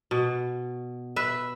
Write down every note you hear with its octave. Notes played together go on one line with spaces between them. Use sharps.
B2
B4 E5